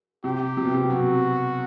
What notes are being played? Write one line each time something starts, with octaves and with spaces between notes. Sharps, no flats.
C3 G4
C3
B2
C3
F#3 F#4